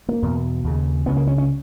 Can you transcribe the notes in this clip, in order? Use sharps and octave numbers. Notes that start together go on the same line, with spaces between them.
A#3
E2 B2
D#2 C#3
C#2 C#3 B3
A#3
C#4
C#4